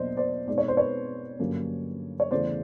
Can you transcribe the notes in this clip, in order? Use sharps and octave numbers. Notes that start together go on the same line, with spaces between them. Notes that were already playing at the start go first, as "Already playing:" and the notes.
Already playing: E2 B2 F#3 A#3 D4 C5 D5 D#5
C5 D5
B2 G#3 C4 D#4 D5
C#5
C5
B4 C#5
G2 D3 F#3 A#3 C#4
C#5
E2 C#3 E3 A3 C5 D5